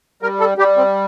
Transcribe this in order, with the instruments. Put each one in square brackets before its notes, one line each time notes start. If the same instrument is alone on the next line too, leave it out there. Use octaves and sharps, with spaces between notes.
[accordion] G3 A#4
A4
G3 G4
C4